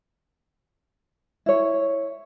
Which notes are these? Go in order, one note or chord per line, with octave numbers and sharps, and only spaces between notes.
E4 C#5